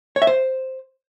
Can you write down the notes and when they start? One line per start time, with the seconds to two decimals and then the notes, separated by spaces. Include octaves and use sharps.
0.16 C#5
0.22 E5
0.27 C5